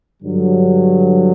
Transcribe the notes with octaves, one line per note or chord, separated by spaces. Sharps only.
G2 D3 F#3